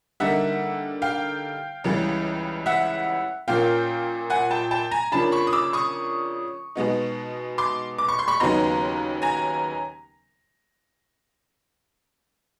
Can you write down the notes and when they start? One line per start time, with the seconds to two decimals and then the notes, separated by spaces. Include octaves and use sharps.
0.20 D3 G3 A#3 D#4 E5 F#5
1.02 F5 G5
1.84 C#2 C#3 E3 G3
2.66 E5 F#5
3.48 A#2 F3 A#3 C#4 F5 G5
4.30 F#5 G#5
4.51 G5 A5
4.71 G5 A5
4.91 G#5 A#5
5.12 C#3 F3 A#3 D4 A5 B5
5.32 B5 C#6
5.47 D#6
5.53 D6 E6
5.73 C#6 D#6
6.75 B2 G#3 B3 D#4
7.58 C6 D6
7.98 D6
8.09 C#6
8.19 C6
8.28 B5 C#6
8.40 D#2 C#3 F#3 B3 D#4 A#5 C6
9.22 G#5 A#5